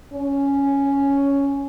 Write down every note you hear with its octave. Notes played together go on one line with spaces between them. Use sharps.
C#4